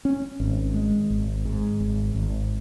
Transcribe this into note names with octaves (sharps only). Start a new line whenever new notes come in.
C#4
G#1
G#3
G#1
G#2
G#1
G#1